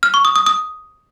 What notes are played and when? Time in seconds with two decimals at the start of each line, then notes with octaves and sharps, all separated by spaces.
0.03 F6
0.14 C#6
0.25 D#6
0.36 D#6
0.46 D#6